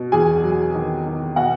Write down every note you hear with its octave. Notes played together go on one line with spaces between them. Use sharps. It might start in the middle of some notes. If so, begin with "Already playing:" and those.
Already playing: B2
E2 G#4 G#5
F#3
D#3
D#3
B2 F#4 F#5